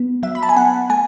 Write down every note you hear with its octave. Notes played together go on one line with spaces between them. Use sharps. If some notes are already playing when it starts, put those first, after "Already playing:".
Already playing: B3
F#3 E5
B5
A5
G#5
B3 F#5
A3 G#5